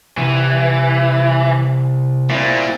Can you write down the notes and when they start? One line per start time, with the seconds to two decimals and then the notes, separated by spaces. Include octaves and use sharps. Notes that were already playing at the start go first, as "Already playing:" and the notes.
0.17 C2 E3
2.30 A#2 C4 E4